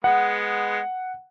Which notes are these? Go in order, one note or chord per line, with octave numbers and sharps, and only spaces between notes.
G#3 B3 F#5